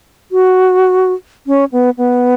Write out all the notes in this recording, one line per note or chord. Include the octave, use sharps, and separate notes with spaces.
F#4
C#4
B3
B3